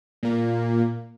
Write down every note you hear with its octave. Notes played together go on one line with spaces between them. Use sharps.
A#2 A#3